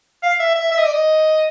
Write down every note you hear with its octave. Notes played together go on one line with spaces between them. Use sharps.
F5
E5
E5
E5
D#5
D5
D#5